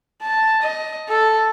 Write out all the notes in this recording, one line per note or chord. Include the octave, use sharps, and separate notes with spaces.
A5
D#5
A4